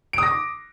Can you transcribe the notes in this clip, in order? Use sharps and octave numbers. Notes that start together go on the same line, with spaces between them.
D6 D#6 A#6 D7